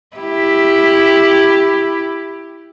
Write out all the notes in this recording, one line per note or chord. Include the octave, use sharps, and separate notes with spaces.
E4 G4